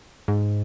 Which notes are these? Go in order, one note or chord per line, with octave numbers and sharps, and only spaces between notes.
G#2